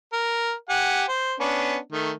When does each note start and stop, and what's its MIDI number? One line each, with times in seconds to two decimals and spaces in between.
0.13 0.52 70
0.69 1.05 67
0.69 1.05 78
0.69 1.05 80
1.08 1.35 72
1.40 1.77 59
1.40 1.77 61
1.40 1.77 62
1.92 2.12 51
1.92 2.12 57